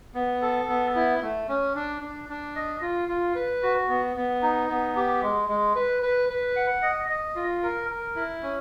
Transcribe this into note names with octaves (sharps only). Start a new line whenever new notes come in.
B3
A4
B3
E4
A3
C#4
D4
D4
D4
D#5
F4
F4
B4
F#4
B3
B3
D#4
B3
G4
G#3
G#3
B4
B4
B4
F#5
D#5
D#5
F4
A#4
A#4
E4
C#4